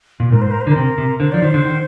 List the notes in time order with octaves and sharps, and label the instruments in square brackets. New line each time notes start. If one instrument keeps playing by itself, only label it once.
[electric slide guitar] A#2
[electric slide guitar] G#2 [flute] A#4
[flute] C5
A#4
C5
[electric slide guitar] D3
[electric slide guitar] C3 [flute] A#4
[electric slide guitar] C3
[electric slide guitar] D3 [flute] C5
[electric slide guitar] F3 [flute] D5
[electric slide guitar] D#3 [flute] C5
[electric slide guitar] D3
D#3